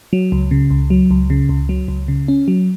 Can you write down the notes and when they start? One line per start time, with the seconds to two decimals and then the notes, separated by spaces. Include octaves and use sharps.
0.13 F#3
0.32 C#2
0.51 C#3
0.71 C#2
0.90 F#3
1.11 C#2
1.30 C#3
1.49 C#2
1.69 F#3
1.88 C#2
2.08 C#3
2.28 C#4
2.48 F#3